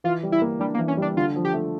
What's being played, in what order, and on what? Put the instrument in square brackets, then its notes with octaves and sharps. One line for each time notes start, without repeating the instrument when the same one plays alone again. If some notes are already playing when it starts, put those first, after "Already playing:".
[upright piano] E3 [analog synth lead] F4
[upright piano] G3
[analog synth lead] E4
[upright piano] A#3
[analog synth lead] G3 [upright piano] D4
[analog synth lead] A#3
[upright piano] E3
[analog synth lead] C#4
[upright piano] G3 [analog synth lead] D4
[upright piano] D3 [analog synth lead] F4
[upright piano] F3
[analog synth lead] G4
[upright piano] A3